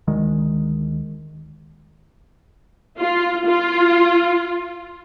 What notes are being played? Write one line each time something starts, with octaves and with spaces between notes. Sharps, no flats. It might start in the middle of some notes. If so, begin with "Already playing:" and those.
D2 D#3 G#3
F4
F4